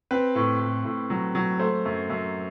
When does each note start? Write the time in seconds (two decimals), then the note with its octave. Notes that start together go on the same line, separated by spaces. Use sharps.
0.11 C4 B4
0.35 A2
0.60 A2
0.85 A2
1.10 F#3
1.35 F#3
1.59 A3 C5
1.85 F#2
2.10 F#2